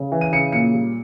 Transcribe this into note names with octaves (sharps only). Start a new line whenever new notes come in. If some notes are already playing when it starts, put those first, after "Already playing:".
Already playing: C#3
E3
D#7
C#3 C#7
A#2 C#7
G3